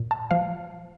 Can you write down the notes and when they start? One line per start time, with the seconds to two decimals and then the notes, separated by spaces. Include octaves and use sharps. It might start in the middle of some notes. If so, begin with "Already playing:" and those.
Already playing: A#2
0.11 A5
0.31 F3 F5